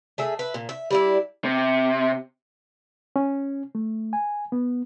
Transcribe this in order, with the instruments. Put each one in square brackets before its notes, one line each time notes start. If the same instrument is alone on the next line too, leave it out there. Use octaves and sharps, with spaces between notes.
[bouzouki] A3 G#4 E5
B4 E5
A#2
E5
G3 D4 E4
[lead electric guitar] C3
[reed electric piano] C#4
A3
G#5
B3